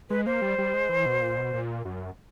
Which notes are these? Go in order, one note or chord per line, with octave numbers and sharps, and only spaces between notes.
G#3 B4
A#3 C5
G3
G3
G#3
E3
B2
A#2
B2
A#2
F#2